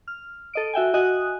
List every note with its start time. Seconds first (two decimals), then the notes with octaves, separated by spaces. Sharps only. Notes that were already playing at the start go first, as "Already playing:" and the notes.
0.07 F6
0.54 A4 D#5 D7
0.73 F#4 E5 G5 G#5
0.94 F#4 D#5 G#5 D#6 F#6